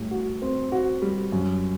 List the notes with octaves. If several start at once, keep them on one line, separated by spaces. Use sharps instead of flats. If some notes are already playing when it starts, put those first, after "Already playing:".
Already playing: A2 G3
F#4
C4
F#4
G3
F#2